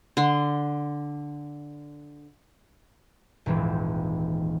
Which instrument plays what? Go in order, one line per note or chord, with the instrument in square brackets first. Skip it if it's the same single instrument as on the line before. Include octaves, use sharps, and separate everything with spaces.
[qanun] D3 C6
[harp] D#1 G#1 E3 C4